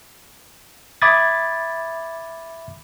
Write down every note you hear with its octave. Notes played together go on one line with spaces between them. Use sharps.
E5 B5 D6 D#6 G#6 A6